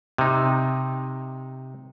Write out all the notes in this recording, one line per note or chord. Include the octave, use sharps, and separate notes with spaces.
C3 D#4